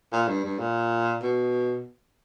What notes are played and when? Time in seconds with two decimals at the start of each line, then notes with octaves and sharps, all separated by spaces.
0.13 A#2
0.28 G2
0.44 G2
0.59 A#2
1.22 B2